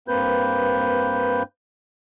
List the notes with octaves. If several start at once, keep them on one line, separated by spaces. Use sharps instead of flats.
G2 A#3 C4 B4 G6